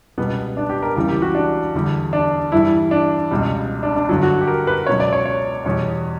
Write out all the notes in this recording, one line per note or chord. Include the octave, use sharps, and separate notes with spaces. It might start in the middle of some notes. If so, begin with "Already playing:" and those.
C#2 B2 G3 B3
D4
G4
A#4
C#2 C#3 E3 G3 A#4
G4
F#4
D4
E2 D3 G3
D4
G2 E3 G3 E4
D4
C#2 B2 G3
D4
D4
G2 D3 F#3
F#4
G4
A#4
B4
C#2 B2 F#3 C#5
D5
C#5
C#5
E2 B2 G3 C#5